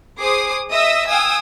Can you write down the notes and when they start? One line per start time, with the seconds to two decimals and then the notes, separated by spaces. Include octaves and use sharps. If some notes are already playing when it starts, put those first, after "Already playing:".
0.18 G#4 C5 D6 D#6 C7
0.70 D#5 E5 D#6 E6 A#6
1.07 F5 G5 G#5 D#6 E6